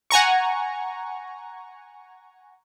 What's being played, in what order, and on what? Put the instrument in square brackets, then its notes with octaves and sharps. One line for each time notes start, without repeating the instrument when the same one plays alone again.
[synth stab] F#5 G#5 A#5 C#6